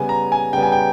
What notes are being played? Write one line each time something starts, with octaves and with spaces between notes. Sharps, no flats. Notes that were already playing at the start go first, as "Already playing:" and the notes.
Already playing: C#3 G3 B3 G#5
A#5
G#5
C#3 G3 B3 G5
G#5
G5